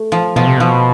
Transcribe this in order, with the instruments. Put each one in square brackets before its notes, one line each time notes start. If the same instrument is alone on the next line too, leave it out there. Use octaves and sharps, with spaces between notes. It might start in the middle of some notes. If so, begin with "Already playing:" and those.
Already playing: [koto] A3
F3
[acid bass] B2 [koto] F3
[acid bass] C3
[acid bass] B2 [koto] F3